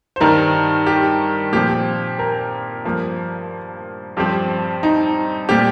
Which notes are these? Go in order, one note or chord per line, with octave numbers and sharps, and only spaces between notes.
C5
G2 D#3 G3 A#4
G4
A#2 F3 C4 G4
A#4
G2 F3 A#3
G2 F3 C4 G4
D#4
A#2 G3 C4 G4